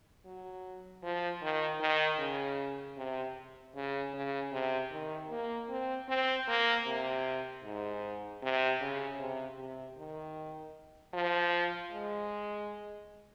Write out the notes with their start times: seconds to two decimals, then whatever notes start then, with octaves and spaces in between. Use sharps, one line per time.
0.25 F#3
1.03 F3
1.42 D#3
1.80 D#3
2.19 C#3
2.97 C3
3.75 C#3
4.13 C#3
4.52 C3
4.92 D#3
5.30 A#3
5.69 C4
6.09 C4
6.48 A#3
6.86 C3
7.64 G#2
8.42 C3
8.81 C#3
9.19 C3
9.58 C3
9.98 D#3
11.14 F3
11.92 G#3